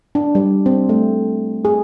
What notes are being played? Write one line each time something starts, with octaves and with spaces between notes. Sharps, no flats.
D4
G3
C4
A3
G#4